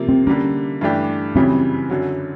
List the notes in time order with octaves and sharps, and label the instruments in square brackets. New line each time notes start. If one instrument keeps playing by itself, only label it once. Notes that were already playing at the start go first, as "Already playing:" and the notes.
Already playing: [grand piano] C3 F3 A#3
[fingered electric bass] C4
[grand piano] D3 G3 A#3 [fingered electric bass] C#4
[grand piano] G2 E3 A3 D4 G4
[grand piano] F#2 C#3 E3 G3 [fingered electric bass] C4
[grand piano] F#2 D3 F#3